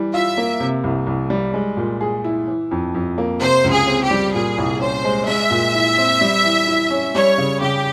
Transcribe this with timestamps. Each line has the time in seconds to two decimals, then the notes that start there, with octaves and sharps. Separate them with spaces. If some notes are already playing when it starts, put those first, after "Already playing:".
Already playing: E3 G3
0.14 F4 E5
0.37 A#3
0.60 C3
0.84 C2
1.07 C2
1.30 G3
1.54 G#3
1.77 A#2
2.01 G#4
2.24 E4
2.48 E3
2.71 F2
2.94 F2
3.18 A#3
3.40 C3 C5
3.64 C#2
3.71 G#4
3.87 C4
4.04 G4
4.11 G3
4.34 A#2 G#4
4.58 C2
4.80 C#4 C5
5.05 G#3
5.28 G#3 E5
5.51 A#2
5.74 E4
5.98 C4
6.21 G3
6.44 E3
6.68 E4
6.90 C#4
7.15 G3 C#5
7.38 C#3
7.61 C#3 G4